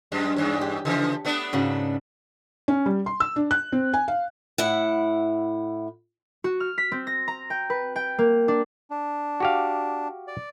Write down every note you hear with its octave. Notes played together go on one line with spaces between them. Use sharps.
F#2 G#3
E2 G2 G#3 C#5
G4
C#3 E3 F3
A3 B3 D4
G#2 C#3 F#4
C#4
G3
C6
E6
D4
F#6
C4
G#5
F5
A2 E4 F#5
F#4
F6
B6
C4
A#6
A#5
G5
B4
G5
A#3
D4
D4
F#4 G4 F5
D5